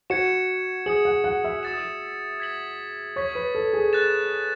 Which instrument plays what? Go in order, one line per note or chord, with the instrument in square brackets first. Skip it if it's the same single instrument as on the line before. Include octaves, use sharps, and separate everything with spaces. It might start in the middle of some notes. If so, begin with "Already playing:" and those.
[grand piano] F#4 [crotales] G#6 C#7 E7
[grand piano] G#4 [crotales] D#6 G#6 C#7 F#7
[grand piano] F#5
F#5
E5
[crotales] D#6 A6 E7
G#6 B6 F#7
[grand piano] C#5 [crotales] C#6 G#6 B6
[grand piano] B4
A4
G#4
[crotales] F#6 A6 E7